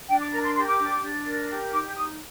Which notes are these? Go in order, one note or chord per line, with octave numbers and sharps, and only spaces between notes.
D4 G5
D6
A#4 A#5
C6
G4 C6
D6
D4
D4
A#4
G4
D#4 D6
D#4 D#6